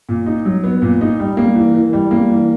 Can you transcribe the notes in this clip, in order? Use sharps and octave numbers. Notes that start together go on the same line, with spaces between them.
A#2
D#4
F#3
B3
A#2
D#4
G3
A#3
E3
E3
G3
A#3
E3